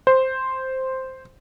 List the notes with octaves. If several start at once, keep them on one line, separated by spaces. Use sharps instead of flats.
C5